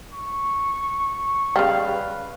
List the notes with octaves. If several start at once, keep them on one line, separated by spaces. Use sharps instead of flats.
C#6
C#3 G3 F5
B4